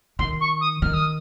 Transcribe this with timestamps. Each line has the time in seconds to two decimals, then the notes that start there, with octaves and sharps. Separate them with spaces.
0.19 D#3 C6
0.41 C#6
0.61 D#6
0.82 D#3 F6
0.94 D#6